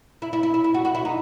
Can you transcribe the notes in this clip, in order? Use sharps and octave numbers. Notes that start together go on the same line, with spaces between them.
E4
E4
E4
E4
E4
F#4
F#4
E4
D#4